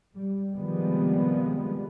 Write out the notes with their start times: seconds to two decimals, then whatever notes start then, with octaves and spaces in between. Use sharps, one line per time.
0.15 G3
0.55 C3 D#3 F3 G3 G#3 B3